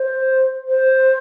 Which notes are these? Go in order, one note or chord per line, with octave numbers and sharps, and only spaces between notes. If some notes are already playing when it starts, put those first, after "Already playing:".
Already playing: C5
C5